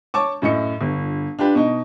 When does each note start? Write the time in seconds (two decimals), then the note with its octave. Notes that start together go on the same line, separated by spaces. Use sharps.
0.14 C#5 A5 C#6 D6
0.42 F#2 A2 D#5 C#7
0.81 G1
1.39 D4 F4 G4 B4
1.55 B2 D#4